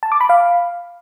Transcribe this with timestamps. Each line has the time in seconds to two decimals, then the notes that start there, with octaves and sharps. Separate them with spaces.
0.03 A5
0.12 D6
0.21 B5
0.29 F5